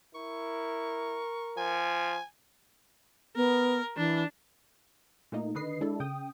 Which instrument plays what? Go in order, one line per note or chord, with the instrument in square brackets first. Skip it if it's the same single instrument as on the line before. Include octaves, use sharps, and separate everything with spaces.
[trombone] E4 [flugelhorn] A#4 [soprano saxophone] C#6
[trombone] F3 [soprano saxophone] G#5
[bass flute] B3 [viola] A#4
[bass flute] E3 [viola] D4
[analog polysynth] A#2 A3 A#3 D#4
D3 D#3 B4 D#5 C7
G#3 D4 E4 A4
C#3 G5 D#6